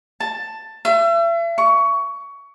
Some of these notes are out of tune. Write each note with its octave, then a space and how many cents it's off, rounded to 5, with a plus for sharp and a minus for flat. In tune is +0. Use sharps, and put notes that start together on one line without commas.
A5 +10
E5 +40
C#6 +20